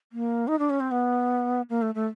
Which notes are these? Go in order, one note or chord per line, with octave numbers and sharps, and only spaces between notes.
A#3
D#4
D4
C#4
C4
B3
A#3
A3
A3